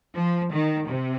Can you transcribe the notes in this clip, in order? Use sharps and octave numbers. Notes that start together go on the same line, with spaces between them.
F3
D#3
C3